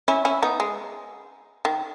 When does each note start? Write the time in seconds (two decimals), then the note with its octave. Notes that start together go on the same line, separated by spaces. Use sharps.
0.08 C#4 E4
0.25 C#4 E4
0.43 B3 D#4
0.60 G#3
1.65 D#3